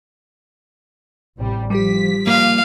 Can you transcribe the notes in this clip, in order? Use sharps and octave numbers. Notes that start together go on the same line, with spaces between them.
A1 C3 G3
F3 G3 G4 B6
A#3 F4 A#4 F5